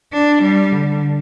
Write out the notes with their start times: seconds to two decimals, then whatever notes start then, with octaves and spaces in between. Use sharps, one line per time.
0.13 D4
0.43 G3
0.72 D3